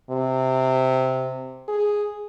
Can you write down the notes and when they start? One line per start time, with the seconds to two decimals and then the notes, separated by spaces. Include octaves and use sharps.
0.10 C3
1.68 G#4